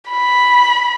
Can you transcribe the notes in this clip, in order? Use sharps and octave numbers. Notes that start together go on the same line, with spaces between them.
B5